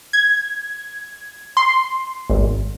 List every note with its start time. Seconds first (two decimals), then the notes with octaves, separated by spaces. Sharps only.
0.13 G#6
1.57 C6
2.30 G#1